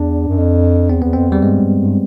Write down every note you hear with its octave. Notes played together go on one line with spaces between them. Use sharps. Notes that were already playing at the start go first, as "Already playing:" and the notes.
Already playing: E2 D4
F#2
F2
E2 C4
E2 B3
F2 C4
E2 G3
G2 G#3
G2
G2